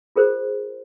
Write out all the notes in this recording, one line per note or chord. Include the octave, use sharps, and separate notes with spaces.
F4 G#4 A#4 C5